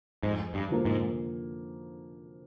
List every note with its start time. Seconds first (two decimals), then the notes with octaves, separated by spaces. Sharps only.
0.23 F2 G#2
0.54 G2
0.70 D3 F3 A#3
0.85 G#2